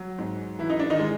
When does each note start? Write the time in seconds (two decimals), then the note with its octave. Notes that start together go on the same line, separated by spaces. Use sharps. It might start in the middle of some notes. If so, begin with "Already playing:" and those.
Already playing: F#3
0.18 G#2
0.59 E3 E4
0.70 D#4
0.79 D4
0.90 D#3 D#4
0.99 G#3